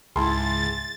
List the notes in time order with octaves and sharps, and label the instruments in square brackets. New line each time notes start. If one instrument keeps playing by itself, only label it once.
[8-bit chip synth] C#2 [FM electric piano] G#2 G#4 [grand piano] E4 A5 C6 [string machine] A6